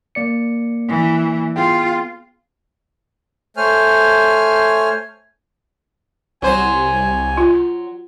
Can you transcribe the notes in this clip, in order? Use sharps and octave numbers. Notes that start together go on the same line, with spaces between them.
A#3 D5 C#7
E3
B3 F4 G#4 G5
A3 C5 C#5 G#5 F6
C2 F#3 C5 G#5
F4